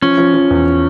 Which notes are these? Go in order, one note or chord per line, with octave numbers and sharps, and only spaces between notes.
F3 C#4
F3
F3
E2